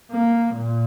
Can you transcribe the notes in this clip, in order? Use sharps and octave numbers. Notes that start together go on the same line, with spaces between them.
A#3
A#2